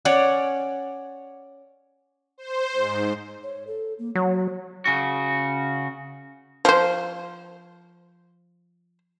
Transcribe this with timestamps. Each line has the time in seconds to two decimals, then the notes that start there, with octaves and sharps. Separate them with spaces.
0.05 C#4 C#5 D5 F#5
2.38 C5
2.72 G#2
3.43 C#5
3.67 A4
3.99 A#3
4.15 F#3 C#5
4.86 C#3 F#4
6.65 F3 C5